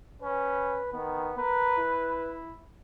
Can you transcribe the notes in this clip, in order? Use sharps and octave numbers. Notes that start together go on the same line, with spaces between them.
C#4 B4
D#3 B3
A#4 B4
E4